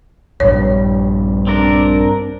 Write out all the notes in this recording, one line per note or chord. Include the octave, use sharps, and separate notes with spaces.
A#1 G2 G3 C#5
C4 D4 A#4